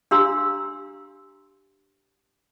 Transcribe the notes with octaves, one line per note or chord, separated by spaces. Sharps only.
D4 G4 F5 A#5 C6 E6